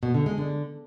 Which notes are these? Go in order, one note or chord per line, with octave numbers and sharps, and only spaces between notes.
B2
D3
G#3
D3